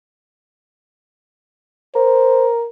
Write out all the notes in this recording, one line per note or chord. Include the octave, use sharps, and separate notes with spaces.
A#4 C5